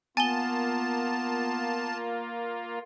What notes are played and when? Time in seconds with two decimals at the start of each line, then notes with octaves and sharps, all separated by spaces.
0.17 A#3 B3 F4 G#5 A5 G7